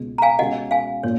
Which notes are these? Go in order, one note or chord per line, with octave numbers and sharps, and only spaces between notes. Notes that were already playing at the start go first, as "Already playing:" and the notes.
Already playing: C#2 B2 G#3
A#5
F5 G#5
B2 G#3 C#4 F#4 D#5 F#5
F5 G#5
A#2 C#5